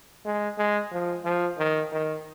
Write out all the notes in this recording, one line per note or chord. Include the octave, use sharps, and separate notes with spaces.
G#3
G#3
F3
F3
D#3
D#3